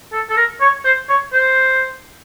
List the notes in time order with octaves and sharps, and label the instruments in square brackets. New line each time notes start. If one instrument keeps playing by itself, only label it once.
[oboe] A4
A4
A#4
C#5
C5
C#5
C5